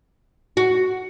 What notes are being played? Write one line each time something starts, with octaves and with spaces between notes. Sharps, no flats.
F#4